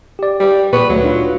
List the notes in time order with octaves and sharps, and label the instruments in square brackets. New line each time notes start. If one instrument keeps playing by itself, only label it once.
[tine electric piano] G4 D5
[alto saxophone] G3
[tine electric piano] A#2 C#6 [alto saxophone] B4
[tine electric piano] D2 A3 [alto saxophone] F#3
[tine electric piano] D4 D#4 F4